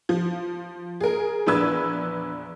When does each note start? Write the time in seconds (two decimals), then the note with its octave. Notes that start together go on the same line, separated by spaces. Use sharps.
0.09 F3
1.01 G#4 A#4
1.46 A#1 E2 D4 B4 E6 G#6